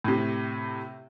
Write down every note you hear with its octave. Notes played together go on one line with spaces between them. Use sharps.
A2 C3